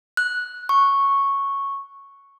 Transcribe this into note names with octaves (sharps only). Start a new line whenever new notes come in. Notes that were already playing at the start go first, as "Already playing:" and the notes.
F#6
C#6